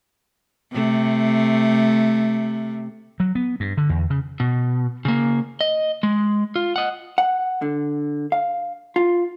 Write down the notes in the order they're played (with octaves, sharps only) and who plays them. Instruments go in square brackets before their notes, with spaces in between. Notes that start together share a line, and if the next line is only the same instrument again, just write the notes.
[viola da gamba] C3 A3
[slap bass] F#3
B3
G2
D3
E2
C#3
[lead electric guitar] B2
C#3 A#3
D#5
G#3
F4
D#5 F#5
[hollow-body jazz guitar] F#5
D3
F5
F4